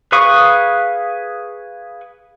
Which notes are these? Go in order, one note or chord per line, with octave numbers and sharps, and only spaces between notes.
G#4 B4 F5 C#6 D#6